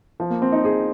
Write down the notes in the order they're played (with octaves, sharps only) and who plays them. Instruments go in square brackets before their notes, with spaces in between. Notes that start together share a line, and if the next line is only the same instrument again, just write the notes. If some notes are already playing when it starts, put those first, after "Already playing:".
[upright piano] F3
A#3
C4
D#4
G#4